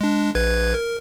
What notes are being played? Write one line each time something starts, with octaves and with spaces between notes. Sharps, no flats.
G#3 D4
A#1 B4 G#6
A#4